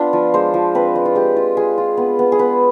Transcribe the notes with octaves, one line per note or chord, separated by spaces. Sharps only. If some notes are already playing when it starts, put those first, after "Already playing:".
Already playing: B3 D4 F4 B5
F3
G#3 C5
F3
C4 B4
G#3
F4
G#3 G4
F4
F4 G#4
F4
B3
B3
G#4
B3 B4